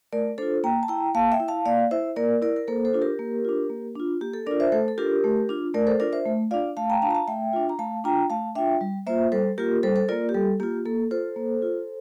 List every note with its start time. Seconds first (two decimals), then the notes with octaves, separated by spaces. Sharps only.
0.13 A3 A#4 D5
0.38 D4 F4 A4 C5
0.64 A#3 G5 A#5
0.83 A5
0.88 E4 G5 A#5
1.15 A#3 F5 A5
1.32 E5 G5
1.40 E4
1.48 F5 A5
1.65 A#3 D5 F5
1.91 E4 C5 E5
2.16 A#3 A#4 D5
2.42 E4 A#4 D5
2.56 A#4
2.68 A#3 A4 C5
2.85 A4 C5
2.93 D4 F4
3.02 G4 A#4
3.19 A#3
3.45 D4 F4
3.70 A#3
3.95 D4 F4
4.21 A#3 G4
4.34 A4
4.46 D4 F4 A#4 D5
4.60 C5 E5
4.72 A3 A4 C5
4.88 A4
4.98 D4 F4 G4 A#4
5.24 A3
5.49 D4 F4
5.74 A3 A#4 D5
5.87 A4 C5
6.00 D4 F4 A#4 D5
6.13 C5 E5
6.26 A3
6.51 D4 F4 D5 F5
6.77 A3 F5 A5
6.90 G5 A#5
7.02 D4 F5 A5
7.06 F4 A#5
7.15 F5 A5
7.27 A3 E5 G5
7.53 D4 F4
7.69 A#5
7.79 A3 F5 A5
8.04 D4 F4 G5 A#5
8.30 A3 F5 A5
8.55 D4 F4 E5 G5
8.81 G3
9.07 A#3 F4 C5 E5
9.32 G3 A4 C5
9.58 A#3 F4 G4 A#4
9.83 G3 A4 C5
9.96 A4 C5
10.08 A#3 F4 A#4 D5
10.29 G4
10.34 G3 A4
10.60 A#3 F4 G4
10.85 A#3 A4
11.11 F4 A4 C5
11.36 A#3
11.62 F4